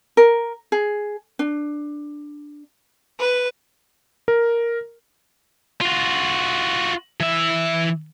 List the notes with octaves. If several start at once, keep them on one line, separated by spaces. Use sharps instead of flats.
A#4
G#4
D4
B4
A#4
F4 F#4
E3 E5